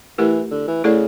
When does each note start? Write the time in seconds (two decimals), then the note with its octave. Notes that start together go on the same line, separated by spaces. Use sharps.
0.18 E3 A3 E4 G4 A#4
0.51 D3
0.67 E3
0.84 C#3 A3 E4 A4 D5